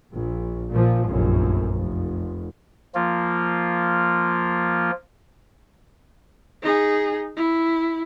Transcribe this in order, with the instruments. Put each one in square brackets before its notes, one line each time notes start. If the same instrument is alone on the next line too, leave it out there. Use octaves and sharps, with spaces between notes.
[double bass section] A#1
A#2 F3
F1 A#1 F#2
F1
[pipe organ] F3 A#3 F4
[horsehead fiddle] D#4 G#4
E4